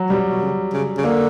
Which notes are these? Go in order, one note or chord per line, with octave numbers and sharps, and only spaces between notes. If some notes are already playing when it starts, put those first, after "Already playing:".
Already playing: F#3
B2 G3
B2
C#3
C#3
C#3
D3 A#3